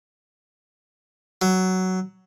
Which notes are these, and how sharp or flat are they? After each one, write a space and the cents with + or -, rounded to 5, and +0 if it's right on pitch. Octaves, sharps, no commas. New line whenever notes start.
F#3 +10